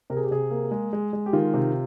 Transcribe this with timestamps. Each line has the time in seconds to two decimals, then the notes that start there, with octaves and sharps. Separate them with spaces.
0.10 C3 A#4
0.17 G#4
0.24 G4
0.31 C3 G#4
0.51 A#3
0.71 G#3
0.93 G#3
1.13 G#3
1.26 G4
1.33 D#3 F4
1.54 C3